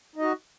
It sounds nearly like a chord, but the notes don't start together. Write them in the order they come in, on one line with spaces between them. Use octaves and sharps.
D#4 D#5 F#4